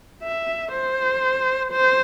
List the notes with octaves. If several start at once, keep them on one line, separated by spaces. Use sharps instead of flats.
E5
C5
C5